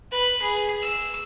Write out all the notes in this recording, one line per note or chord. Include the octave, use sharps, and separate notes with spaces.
B4
G#4
E6